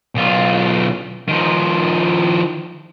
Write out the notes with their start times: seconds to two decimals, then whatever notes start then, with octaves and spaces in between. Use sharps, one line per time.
0.15 B1 F4
1.28 D#3 F3